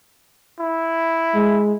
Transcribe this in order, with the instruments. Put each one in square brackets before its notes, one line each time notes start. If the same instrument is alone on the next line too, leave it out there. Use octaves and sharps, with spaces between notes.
[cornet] E4
[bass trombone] G#3